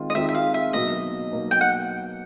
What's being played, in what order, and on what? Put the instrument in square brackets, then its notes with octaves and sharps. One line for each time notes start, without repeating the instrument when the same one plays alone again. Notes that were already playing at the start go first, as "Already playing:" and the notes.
Already playing: [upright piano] D#3 G#3 C4 F4
[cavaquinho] D#5
[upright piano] D#3 G#3 C4 F4 [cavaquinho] E5
[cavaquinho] E5
F5
E5
[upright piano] B2 F#3 A#3 D#4 [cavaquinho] D#5
[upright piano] B2 F#3 A#3 D#4
[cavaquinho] G5
F#5